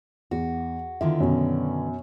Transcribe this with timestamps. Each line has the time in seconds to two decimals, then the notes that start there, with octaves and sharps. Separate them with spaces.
0.31 E2 F#4
1.01 D3 D#3 B3 E4 F4
1.20 F#2 B2